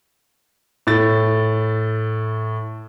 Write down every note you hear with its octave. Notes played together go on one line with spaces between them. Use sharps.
A2 A6